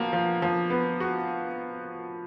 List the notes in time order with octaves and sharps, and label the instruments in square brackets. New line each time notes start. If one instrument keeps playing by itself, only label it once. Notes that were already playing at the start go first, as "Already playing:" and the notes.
Already playing: [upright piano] F3 B3 F#4 [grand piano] A#3
[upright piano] F3
F3
B3
F#4